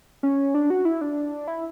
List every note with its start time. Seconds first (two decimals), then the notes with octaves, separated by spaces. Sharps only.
0.23 C#4
0.54 D4
0.70 F#4
0.85 E4
1.01 D4
1.48 E4